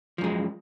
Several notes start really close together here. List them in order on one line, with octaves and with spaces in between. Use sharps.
F3 F#2 G#3